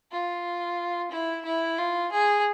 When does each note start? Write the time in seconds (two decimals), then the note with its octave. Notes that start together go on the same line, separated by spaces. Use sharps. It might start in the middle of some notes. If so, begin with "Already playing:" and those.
0.11 F4
1.11 E4
1.45 E4
1.78 F4
2.12 G#4